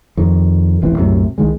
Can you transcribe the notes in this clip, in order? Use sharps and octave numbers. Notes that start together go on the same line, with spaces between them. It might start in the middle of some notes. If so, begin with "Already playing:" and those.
F2 D#3
D#1 A1 E3 C4
C2 F#2 A2 C3
C2 D#3 G#3